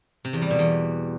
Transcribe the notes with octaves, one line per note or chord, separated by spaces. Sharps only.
C3
E2
G3
B2
E2